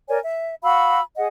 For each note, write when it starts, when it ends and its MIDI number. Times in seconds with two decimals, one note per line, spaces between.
0.09 0.18 70
0.09 0.18 73
0.09 0.18 74
0.09 0.18 80
0.23 0.55 76
0.63 1.01 66
0.63 1.01 77
0.63 1.01 83
0.63 1.01 88
1.17 1.27 68
1.17 1.27 75
1.17 1.27 78